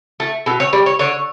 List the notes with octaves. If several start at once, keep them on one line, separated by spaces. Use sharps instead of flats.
A3
B2 A4
C#5
G3 D5
C#5
D3 C#5